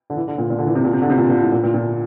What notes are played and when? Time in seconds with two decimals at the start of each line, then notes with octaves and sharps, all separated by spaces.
0.10 D3
0.17 E3
0.28 D3
0.38 A#2
0.50 A#2
0.58 D3
0.67 E3
0.75 C3
0.85 A#2
0.93 C3
1.02 D3
1.10 C3
1.18 A#2
1.29 A#2
1.41 A2
1.52 A#2
1.64 A#2
1.74 A#2